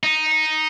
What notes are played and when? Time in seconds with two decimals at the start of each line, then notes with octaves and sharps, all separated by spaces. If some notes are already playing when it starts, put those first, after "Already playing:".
0.03 D#4